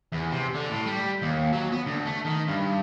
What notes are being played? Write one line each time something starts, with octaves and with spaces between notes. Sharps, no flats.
E2
C3
D3
A2
G3
D#2
F#3
B3
D2
A3
D#3
G2